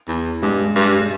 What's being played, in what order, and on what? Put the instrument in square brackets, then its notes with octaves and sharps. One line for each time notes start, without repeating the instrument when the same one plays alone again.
[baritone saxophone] E2
[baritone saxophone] G2 [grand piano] G#3
[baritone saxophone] G2
[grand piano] G#3